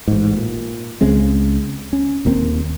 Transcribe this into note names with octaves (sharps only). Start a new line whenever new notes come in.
A1 G#2
A#2
C#2 C#3 G#3 C4
C#4
D#1 D#2 A#3 C4